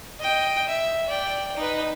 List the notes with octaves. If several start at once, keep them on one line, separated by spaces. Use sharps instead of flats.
D#5 G5
E5
D5 G5
D#4 B4